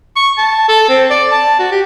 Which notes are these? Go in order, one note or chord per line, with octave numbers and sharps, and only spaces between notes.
C#6
A5
A4
C4
D5
A5
F#4
G4